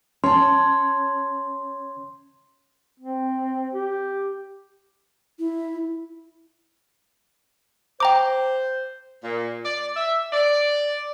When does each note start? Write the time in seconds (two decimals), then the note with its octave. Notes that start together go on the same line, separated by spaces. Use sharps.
0.24 C#4 C#5 A5 C6
2.99 C4
3.73 G4
5.39 E4
8.00 C5 G5 A#5 D6
9.23 A#2
9.65 D5
9.97 E5
10.33 D5